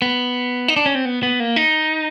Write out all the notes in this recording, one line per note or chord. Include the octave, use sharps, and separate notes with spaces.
B3
D#4
D4
C#4
C4
B3
B3
A#3
D#4